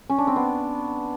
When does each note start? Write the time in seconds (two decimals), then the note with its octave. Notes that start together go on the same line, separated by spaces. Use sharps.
0.10 C#4
0.18 D4
0.27 C4
0.36 B3